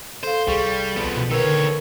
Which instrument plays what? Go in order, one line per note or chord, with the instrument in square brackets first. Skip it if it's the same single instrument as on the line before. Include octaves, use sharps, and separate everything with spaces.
[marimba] A4 F5 [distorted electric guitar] C5
[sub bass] C2 [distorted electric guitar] G3 [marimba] G#4 C#6
[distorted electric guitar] F3 B3
[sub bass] B2
[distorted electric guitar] D#3 C#5 [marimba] A#4 B4 E6
[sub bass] D3